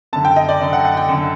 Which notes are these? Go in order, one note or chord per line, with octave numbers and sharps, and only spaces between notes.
F#2 D3 A5
G5
D#5
D5
F#2 D3
F#5
F#5
G5
F#2 D3